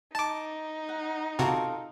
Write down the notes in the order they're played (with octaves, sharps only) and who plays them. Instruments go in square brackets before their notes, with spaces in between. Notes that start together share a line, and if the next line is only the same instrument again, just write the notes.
[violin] D#4 [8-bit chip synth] A5 D6
[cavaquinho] F#5
[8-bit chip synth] C3 F#4 [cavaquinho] F4 A4 A#4